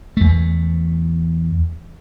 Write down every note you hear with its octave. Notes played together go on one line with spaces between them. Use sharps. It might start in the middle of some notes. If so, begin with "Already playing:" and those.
E2 A3